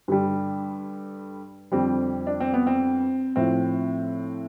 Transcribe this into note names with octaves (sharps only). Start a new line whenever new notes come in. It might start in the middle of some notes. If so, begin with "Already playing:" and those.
G2 D3 G3
F2 D3 G3 C4
D4
C4
B3
C4
A2 F3 C4